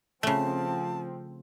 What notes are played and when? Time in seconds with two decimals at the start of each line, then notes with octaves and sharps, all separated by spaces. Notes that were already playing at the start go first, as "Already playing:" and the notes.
0.23 C#3 F3 A3 C4 A5